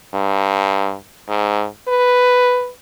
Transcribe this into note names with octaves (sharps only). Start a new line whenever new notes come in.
G2
G#2
B4